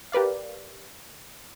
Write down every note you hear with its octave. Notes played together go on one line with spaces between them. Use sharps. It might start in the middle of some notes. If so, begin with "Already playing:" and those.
G4 A#4 B4 D5 F5